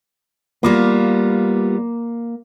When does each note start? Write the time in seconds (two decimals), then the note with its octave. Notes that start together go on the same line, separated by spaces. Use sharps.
0.63 G3 A#3 B3 F4